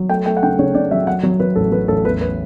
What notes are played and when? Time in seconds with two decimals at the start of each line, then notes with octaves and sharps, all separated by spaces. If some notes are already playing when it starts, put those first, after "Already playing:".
Already playing: F#3
0.09 A3 G5
0.26 A3 G5
0.37 F#5
0.43 C#3 G5
0.59 C#3 C#5
0.75 C#3 D5
0.91 F#3 E5
1.07 F#3 F#5
1.23 F#3 C#5
1.40 F#3 B4
1.56 A1 A4
1.72 F#3 B4
1.88 A1 A4
2.05 E2 B4
2.21 B4